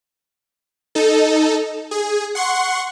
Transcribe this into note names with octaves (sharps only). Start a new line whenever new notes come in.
D#4 A4
G#4
F#5 C6 C#6